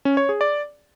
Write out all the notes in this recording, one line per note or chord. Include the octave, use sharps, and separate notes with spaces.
C#4
C#5
G#4
D5